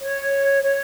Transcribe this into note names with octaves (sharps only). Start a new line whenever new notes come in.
C#5
C#5